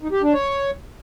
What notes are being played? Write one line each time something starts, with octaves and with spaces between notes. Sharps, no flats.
D#4
G4
D4
C#5